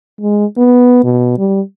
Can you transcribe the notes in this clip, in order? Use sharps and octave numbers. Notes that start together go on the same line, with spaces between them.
G#3
B3
B2
G3